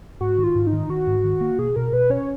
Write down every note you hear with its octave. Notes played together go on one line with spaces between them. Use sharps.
G#2 F#4
D#3
F4
G#2
D#4
D#3
D#3 F#4
G#2
D#3
A#3
B2 G#4
B2 A#4
B2 B4
C#4 C#5